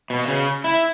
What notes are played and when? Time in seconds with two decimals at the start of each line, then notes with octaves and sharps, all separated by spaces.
0.10 B2
0.28 C#3
0.64 E4